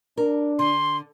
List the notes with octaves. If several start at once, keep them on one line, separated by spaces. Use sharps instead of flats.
D4 A#4
D3 C6